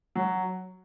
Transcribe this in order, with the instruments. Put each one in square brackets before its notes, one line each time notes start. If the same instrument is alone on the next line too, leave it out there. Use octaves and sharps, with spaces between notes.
[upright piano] F#3